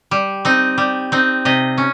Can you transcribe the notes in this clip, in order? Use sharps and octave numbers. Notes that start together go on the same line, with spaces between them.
G3
C4 D#4
G3
C4 D#4
C3 D#5
C#4